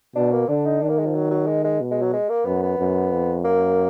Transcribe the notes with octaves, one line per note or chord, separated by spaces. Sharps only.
B2 D4
A#3
D3 D4
D#4
D#3 D4
A#3
G#3
F3
F#3
F#3
G#3
G#3
B2
G#3
F#3
G#3
A#3
F#2 B3
B3
F#2
F2
F#2 A#3